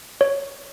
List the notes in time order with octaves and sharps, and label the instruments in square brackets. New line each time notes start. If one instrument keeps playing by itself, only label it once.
[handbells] C#5